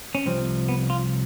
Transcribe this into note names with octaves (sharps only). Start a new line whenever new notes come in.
C#4
C2 C3 F3 C4
B3
F4